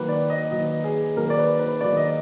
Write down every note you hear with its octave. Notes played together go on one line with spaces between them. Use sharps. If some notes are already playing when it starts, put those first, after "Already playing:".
Already playing: D#3 F#3 A#3 B4
D5
D#5
D#3 F#3 A#3 D#5
G#4
D#3 F#3 A#3 A#4
D5
B4
B4
D#3 F#3 A#3 D5
D#5